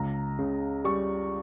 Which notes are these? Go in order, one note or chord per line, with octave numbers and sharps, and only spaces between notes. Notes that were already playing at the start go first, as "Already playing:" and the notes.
Already playing: C#2 A#5
C#3
G3 C#6